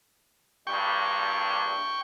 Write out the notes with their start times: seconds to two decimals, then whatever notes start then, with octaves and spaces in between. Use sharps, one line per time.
0.67 A#1 G2 G3 G5 C#6